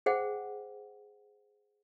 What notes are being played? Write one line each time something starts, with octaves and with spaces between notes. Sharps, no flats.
G#4 C5 F#5 G5